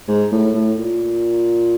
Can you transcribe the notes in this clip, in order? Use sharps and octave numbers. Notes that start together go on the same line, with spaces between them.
G#2
A2
A2
A#2